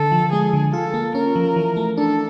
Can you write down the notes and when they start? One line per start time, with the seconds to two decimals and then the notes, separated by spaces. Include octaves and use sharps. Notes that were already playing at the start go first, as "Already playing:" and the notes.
Already playing: D3 A4
0.12 F3
0.32 G#3 G#4
0.53 D3
0.73 F4 A4
0.94 A#3
1.15 C#4 A#4
1.36 F3
1.56 E3
1.77 A3
1.97 D4 A4